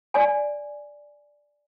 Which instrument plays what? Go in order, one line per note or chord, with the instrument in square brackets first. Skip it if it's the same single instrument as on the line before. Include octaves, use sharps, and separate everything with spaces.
[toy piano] D5 G#5